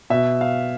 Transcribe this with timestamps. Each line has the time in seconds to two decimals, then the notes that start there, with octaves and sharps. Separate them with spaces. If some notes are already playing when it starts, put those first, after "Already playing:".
0.10 B2 E5
0.41 F5